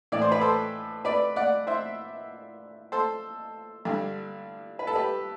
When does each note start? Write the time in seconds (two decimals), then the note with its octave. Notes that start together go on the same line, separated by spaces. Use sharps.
0.12 A2 E3 D5
0.22 C5
0.32 B4
0.41 A4 C5
1.05 B4 D5
1.36 D5 F#5
1.67 C5 E5
2.92 A4 C5
3.85 G2 D3
4.79 B4
4.87 A4
4.95 G4 B4